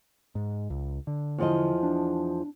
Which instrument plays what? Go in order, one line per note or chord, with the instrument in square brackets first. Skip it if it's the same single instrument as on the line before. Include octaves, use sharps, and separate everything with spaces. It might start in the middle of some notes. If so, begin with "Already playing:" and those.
[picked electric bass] G#2
C#2
D3
[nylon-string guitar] E2 F3 D#5
[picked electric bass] D4